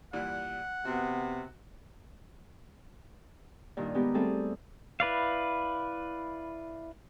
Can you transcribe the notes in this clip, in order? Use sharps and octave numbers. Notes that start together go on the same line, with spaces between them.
A#2 E3 G3 F#5
C3 B3 F#4
G2 A#2 D#3
G#3 B3 D#4 G4
G3 A3 C4 G#4 A4
E4 B4 D5 F5